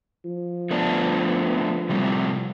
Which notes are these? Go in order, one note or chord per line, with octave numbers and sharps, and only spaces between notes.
F3
A3 B3 D4
C3 G3 A3